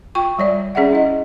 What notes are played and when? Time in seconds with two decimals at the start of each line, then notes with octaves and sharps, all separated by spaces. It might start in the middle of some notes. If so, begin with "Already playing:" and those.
0.15 F4 G5 C#6
0.38 G3 C#5 D5
0.75 C#4 G#4 D5 E5 F#5
0.93 E4 D#5